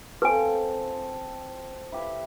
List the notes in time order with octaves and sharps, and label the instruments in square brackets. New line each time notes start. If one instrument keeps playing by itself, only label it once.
[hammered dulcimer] C4 F4 A4 [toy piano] B4 G#5
[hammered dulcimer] E4 G4 B4